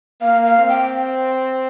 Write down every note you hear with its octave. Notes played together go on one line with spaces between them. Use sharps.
A#3 F5
F5
C4
G5